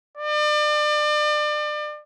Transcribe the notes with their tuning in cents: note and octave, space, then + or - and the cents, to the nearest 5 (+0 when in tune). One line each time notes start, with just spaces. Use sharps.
D5 +35